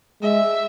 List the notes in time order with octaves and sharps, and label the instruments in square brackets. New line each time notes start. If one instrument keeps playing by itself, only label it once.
[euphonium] G#3 [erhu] E5